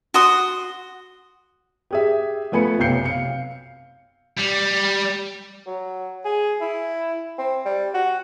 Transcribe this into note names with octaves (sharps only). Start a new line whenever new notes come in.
F#4 C6 D#6
G4 G#4 E5
F3 A3 B3 G#5 B5 C#7
B1 F#2 C3 G6 C7 C#7
F5 C#7
G3
F#3
G#4
E4
C4
G3
F#4